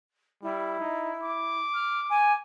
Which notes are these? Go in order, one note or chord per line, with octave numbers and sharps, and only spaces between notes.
G3 E4
D#4
D6
F6
G#5